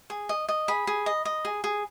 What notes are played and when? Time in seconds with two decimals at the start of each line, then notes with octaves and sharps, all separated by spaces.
0.10 G#4
0.29 D#5
0.49 D#5
0.68 G#4 B5
0.87 G#4
1.06 D#5
1.25 D#5
1.45 G#4
1.64 G#4